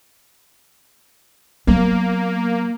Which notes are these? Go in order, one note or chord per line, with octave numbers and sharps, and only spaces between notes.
F#3 A#3 B3